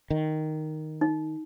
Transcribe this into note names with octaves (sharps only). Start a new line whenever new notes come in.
D#3
D#4